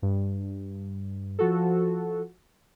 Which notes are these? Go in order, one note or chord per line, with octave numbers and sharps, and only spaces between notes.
G2
F3 F#4 A4